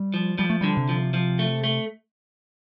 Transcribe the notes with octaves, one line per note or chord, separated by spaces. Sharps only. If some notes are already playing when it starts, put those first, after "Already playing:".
Already playing: G3
F3
F3 G3
A3
D3 G3
C3
F3
F3
A3
A3